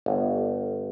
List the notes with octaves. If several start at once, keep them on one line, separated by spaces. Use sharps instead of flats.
G1